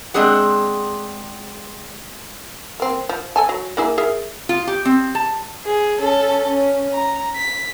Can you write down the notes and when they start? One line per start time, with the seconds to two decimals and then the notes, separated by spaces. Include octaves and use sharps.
0.14 G#3 C4 D4 G#4 F#5
2.80 A#3 C4
3.09 F3
3.36 A4 G#5 A5
3.49 F#3
3.77 A#3 E4 G#4
3.98 G#4 A#4 E5
4.49 F4
4.67 G4
4.85 C4
5.15 A5
5.65 G#4
5.99 C#4 A4
6.51 C#4
6.93 A#5
7.36 B6